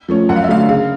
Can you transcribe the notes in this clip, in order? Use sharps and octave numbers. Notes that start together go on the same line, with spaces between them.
F3 A3 C#4
F#2 F#5
F5
E5
D3 F#3 A3 F5
C#3 F5